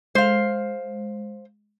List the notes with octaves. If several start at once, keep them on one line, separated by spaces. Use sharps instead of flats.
G#3 C5 F5